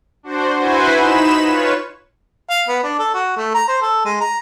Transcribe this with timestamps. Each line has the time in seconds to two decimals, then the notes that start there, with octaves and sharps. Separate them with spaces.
0.23 D4 F#4 C5
0.58 E4 F#4 B4 C5 G#5
0.96 D#4 B5 E7
1.44 F4 B4 C#5
2.50 F5
2.68 B3
2.83 D4
2.99 A4
3.14 F#4
3.36 A3
3.54 A#5
3.68 C5
3.81 A4
4.05 G#3
4.21 A#5